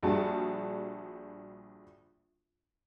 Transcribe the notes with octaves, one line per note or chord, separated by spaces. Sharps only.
A#1 G3 D4 F#4 G#4 A5